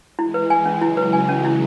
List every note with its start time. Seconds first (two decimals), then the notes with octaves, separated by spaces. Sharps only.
0.18 E3 G#3 E4
0.34 B4
0.50 G#5
0.66 C#4
0.81 C#3 F#3 E4
0.97 B4
1.13 G#5
1.29 C#4
1.45 E4